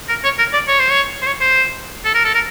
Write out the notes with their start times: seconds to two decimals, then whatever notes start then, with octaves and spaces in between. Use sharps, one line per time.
0.09 A#4
0.24 C#5
0.38 A#4
0.53 D5
0.68 C#5
0.79 C5
0.90 C#5
1.22 C5
1.27 C#5
1.41 C5
2.05 A4
2.15 A#4
2.24 A4
2.34 A#4